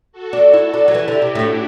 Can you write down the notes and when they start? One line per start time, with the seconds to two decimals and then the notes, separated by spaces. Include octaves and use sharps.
0.12 F#4 A4
0.33 D4
0.53 E4
0.74 D4
0.88 F#3
0.94 E3 E4 G4
1.08 D3
1.22 C3
1.35 A2 D4 F#4